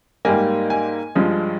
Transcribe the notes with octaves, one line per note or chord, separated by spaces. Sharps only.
G#2 G3 A#3 G#5
G#5
G2 F3 G#3